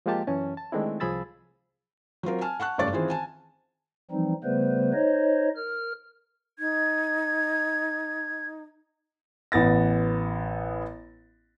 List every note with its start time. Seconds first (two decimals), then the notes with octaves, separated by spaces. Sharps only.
0.06 F3 G#3 A#3 F4 G4 A5
0.27 F#2 E3 C#4 A5
0.57 A5
0.72 D#3 G#3 A3 C4 D4 E4
1.00 C2 F3 G#4 B5 E6 A6
2.23 F#3 C4 F4 A#4
2.41 G#5 A5 F6
2.60 F#5 A5 C#6 F#6
2.78 F#1 G2 A3 D5 C#6 A6
2.93 D#3 E3 C4 F4 G#4 C5
3.10 G#5 A5
4.11 E3 F3 G3 C4 D#4
4.44 C#3 G3 A3 B3 B4 C5
4.93 D#4 C5 C#5 D#5
5.56 A#4 F6
6.59 D#4 G#6
9.52 A1 B3 A6 A#6